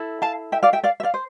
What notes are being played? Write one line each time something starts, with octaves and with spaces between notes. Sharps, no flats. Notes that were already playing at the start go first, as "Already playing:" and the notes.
Already playing: E4 A4
F5 A5
E5 G5
D5 F5
E5 G5
D5 F5
E5
D5 F5
C5